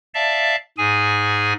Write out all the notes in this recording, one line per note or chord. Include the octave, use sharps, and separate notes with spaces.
D5 E5 F5 A5
G#2 G#4 G#5